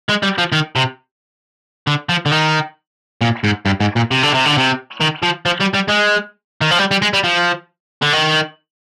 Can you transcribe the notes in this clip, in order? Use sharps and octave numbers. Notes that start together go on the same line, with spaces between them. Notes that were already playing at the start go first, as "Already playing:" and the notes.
G#3
G3
F3
D#3
C3
D3
F3
D3
D#3
A#2
G#2
G2
G#2
A#2
C3
D3
C3
D3
C3
D#3
F3
F3
G3
G3
G#3
D#3
F3
G3
G3
G#3
G3
F3
D3
D#3